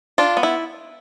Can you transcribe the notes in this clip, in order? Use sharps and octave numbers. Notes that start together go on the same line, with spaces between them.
D4 F4
B3
E4